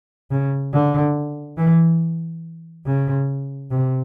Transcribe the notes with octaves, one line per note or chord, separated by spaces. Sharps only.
C#3
D3
E3
C#3
C3